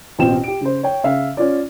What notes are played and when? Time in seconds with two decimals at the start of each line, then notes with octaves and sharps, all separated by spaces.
0.19 A1 B2 C4 F4 G5 E7
0.44 G4 D7
0.61 C#3 C5
0.83 C#5 G5
1.04 C#3 E5 F5
1.37 C#4 F4 D5